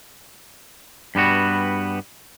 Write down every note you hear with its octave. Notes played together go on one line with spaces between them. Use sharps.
G2 G3 B3 F#4